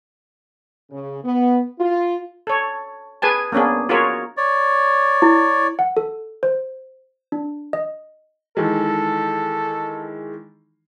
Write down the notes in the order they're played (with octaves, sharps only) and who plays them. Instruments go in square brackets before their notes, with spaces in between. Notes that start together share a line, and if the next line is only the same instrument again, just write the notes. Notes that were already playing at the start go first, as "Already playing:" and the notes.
[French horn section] C#3
B3
F4
[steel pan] A4 C#5
G#4 B4 G#5 A5
A#3 B3 C#4 D4 G#4
F4 F#4 G#4 A#4 C#5
[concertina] C#5 D5
[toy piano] E4
[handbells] F#5
A4
C5
D4
D#5
[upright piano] D#3 E3 G#3 [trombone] A4